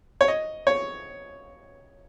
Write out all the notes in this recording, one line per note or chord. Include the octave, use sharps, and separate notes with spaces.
C#5
D#5
C#5